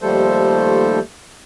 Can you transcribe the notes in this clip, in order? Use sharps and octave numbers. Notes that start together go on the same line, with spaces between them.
D#2 F3 G3 A3 A4 C5